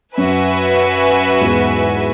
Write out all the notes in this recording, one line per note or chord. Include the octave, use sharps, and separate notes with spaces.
F#2 F#4 B4 E5 G#5
E2 G#2